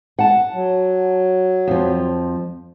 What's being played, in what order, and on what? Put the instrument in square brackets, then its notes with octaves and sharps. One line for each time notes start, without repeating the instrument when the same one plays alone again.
[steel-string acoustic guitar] F#5 A5
[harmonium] F#3
[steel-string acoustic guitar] F2 F3